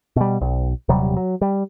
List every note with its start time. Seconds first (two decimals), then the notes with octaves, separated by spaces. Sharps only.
0.16 B2 G3
0.41 B1
0.89 D#1 C3 F#3 G3
1.17 F#3
1.42 G3